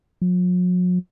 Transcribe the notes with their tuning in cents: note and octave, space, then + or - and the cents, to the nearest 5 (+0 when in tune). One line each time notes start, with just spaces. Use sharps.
F#3 -45